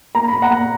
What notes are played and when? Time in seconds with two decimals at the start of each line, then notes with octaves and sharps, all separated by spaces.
0.15 A#3 A#5
0.28 A#2 B5
0.42 F#5 A#5
0.50 A#2